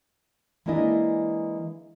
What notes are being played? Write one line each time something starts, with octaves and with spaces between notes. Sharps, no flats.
E3 G#3 A#3 D4 E4 D#5